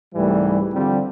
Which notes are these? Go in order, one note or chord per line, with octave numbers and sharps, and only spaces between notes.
C2 G#2 E3 G3 A3
D3 F3 G3 C4